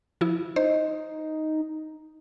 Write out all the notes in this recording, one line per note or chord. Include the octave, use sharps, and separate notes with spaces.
F3 E4
D#4 C5